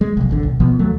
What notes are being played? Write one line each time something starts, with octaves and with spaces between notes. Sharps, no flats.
G#3
F1 B1
D#1 G#1 D3
B1
B1 B2 F3 B3
D#2 F#3 A3